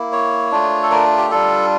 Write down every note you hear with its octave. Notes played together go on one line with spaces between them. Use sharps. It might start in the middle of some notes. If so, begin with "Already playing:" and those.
Already playing: A#3 E4
C#5
A3 D4 F4
A4
A#4
G4
G3 D4 F4 A4